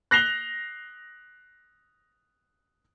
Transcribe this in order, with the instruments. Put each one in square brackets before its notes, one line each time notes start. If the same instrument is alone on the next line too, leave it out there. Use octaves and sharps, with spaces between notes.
[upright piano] F#6 A#6 C7 F7 G7